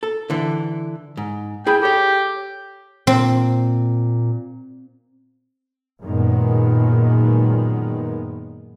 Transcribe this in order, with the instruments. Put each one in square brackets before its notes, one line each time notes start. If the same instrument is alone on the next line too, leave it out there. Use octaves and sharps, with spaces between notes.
[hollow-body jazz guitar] A4
D3 E3
G#2
[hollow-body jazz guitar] E4 G#4 B5 [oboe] G5
[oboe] G4 [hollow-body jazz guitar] A4 C#5
[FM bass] A#2 [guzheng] C4
[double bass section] F#2 A#2 D#3 G#3 B3